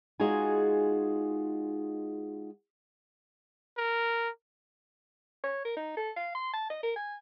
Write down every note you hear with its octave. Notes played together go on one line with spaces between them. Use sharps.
G#3 D#4 F4 F#4 G#4 G#5
A#4
C#5
A#4
D#4
A4
F5
C6
A5
D#5
A#4
G#5